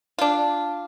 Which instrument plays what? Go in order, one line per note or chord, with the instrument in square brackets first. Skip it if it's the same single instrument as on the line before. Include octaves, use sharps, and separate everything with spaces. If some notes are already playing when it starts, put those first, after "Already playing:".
[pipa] D4 F4